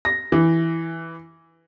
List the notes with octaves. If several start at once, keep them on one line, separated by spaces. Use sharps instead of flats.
A#6
E3